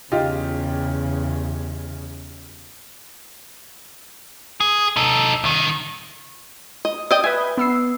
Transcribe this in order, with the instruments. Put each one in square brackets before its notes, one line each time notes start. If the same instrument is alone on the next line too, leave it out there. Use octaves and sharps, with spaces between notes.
[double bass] E2 C#3 [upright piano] D#4 F4 G4
[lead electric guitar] G#4
D#4 A4
C2 D#3
[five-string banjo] D#5
[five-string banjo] D5 D#5 G5 [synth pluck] D#6
[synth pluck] B4 E5 [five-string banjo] G#5
[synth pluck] B3 E6 C7